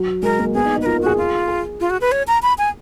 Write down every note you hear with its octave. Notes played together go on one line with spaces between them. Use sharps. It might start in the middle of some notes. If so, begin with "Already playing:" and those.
Already playing: F#3
G#3 A#4
A#3
B3 G#4
D#4
D#4
B4
F4 A#4
A#4
F#4 G#4
F4
G#4
F4
F#4
B4
C#5
A#5
B5
G#5